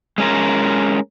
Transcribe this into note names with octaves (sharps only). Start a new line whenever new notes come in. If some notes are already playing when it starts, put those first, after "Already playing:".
G#3 C#4 A#4